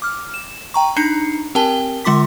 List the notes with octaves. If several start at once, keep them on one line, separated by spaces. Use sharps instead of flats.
D6 F6
E7
G5 A#5 C#6
D4 D#4 A#5 C7 C#7
C4 G4 A#4 G5 A5 G7
D3 G#3 F4 C6 D6 B6